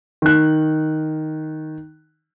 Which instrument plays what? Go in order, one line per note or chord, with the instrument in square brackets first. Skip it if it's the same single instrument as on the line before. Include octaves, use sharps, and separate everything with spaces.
[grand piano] D#3 F#6